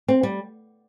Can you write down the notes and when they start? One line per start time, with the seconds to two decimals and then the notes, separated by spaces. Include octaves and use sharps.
0.08 C4
0.23 G3